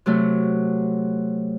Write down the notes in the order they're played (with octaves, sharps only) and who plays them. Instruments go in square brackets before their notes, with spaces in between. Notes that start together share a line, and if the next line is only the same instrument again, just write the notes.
[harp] C3 F#3 A3